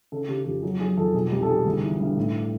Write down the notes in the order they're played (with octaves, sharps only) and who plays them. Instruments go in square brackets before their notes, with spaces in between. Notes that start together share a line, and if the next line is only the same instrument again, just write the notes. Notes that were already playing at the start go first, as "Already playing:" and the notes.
[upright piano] C#3 A4
C#3 G4
F2 G4
F#3 G#4
F#3 G#4
F2 A4
B2 G#4
C2 G4
A4
G3 G#4
G1
E3
G2
A2